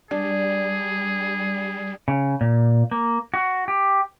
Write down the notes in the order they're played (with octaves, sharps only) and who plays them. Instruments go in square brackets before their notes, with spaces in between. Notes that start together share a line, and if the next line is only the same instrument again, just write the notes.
[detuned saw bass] G3 [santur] D4 [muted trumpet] G#4
[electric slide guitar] C#3
A#2
A#3
F#4
G4